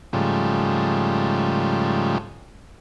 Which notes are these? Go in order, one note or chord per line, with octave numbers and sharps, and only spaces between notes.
G#2 C#3 F3 G3 A3